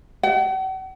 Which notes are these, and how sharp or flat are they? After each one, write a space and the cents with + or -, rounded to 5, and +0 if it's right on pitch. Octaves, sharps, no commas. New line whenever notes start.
F#5 +45